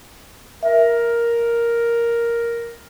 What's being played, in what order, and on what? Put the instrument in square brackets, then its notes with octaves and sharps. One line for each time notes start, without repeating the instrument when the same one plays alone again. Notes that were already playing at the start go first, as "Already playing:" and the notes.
[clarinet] A#4 [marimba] E5